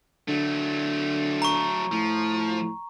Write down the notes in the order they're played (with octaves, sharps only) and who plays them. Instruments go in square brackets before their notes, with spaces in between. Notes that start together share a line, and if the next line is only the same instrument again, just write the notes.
[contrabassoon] D3 [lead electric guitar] F#3 A3
[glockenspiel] A#5 C#6
[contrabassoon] A2 [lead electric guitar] F3